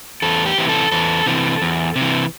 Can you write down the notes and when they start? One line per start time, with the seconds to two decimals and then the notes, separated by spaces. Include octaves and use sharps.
0.22 E2 A4
0.46 G4
0.58 C3 E3
0.69 A4
0.92 E2 A4
1.26 C3 E3
1.62 E2
1.96 C3
2.01 E3